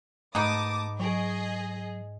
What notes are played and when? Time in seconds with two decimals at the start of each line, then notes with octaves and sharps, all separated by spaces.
0.35 G#2 A3 B3 D#4 A5 D6 D#6
1.00 F#3 G#4 D#5 C#6 D7